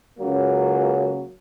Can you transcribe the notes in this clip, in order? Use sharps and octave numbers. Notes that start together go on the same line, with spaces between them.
C#2 C#3 F#3 A#3